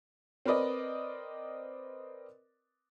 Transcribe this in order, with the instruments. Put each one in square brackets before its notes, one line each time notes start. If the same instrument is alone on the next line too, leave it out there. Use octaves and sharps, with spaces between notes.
[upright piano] C4 A#4 B4 D5 D#5